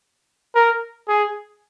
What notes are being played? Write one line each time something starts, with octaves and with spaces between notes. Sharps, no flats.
A#4
G#4